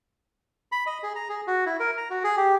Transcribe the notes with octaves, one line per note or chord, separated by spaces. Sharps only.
B5
D#5
G#4
A#5
G#4
F#4
E4
A#4
A#5
F#4
G#4
G4